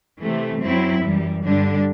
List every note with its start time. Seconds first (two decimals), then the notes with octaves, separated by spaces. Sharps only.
0.21 C3 E3 A3
0.61 F#2 F#3 C4 E4
1.03 F#2 E3 G3
1.43 G2 D3 G3 D4